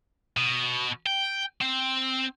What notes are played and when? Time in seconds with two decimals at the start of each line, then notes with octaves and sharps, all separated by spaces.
0.37 B2
1.06 G5
1.62 C4